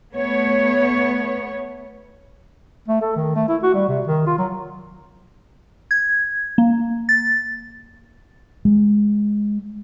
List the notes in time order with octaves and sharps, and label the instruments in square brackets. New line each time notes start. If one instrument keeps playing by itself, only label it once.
[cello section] A3 B3 C#5
[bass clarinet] A3
A4
D#3
A3
E4
F#4
G3
C3
D#3
F4
F#3
[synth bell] G#6
A#3
A6
[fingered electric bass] G#3